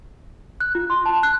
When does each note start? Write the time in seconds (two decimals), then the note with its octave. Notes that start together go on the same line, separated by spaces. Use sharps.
0.60 F#6
0.75 F4
0.90 C6
1.06 A5
1.23 F#6